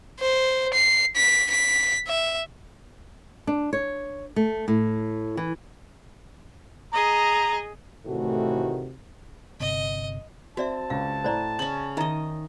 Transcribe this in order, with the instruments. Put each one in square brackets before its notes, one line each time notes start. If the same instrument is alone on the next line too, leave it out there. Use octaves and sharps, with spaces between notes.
[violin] C5
C7
B6
B6
E5
[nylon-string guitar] D4
C#5
A3
A2
E3
[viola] G#4 D#5 [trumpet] A#5
[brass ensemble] A2 C3 D#3 E3 A3 F#4
[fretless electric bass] G1 C3 [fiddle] D#5
[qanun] C4 [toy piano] F#4 D5 E5 [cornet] A5
[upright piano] C#2 [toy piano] F5
[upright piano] A2 [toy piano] C5 D5 A#5
[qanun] C#3 C#4 [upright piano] F#7
[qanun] D#3 D#5 [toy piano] D#4 E5 A#5